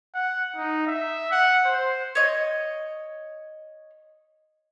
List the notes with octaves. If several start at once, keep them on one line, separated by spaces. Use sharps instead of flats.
F#5
D#4
E5
F#5
C5
C#5 D#5